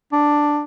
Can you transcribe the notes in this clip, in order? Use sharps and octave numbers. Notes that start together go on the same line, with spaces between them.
D4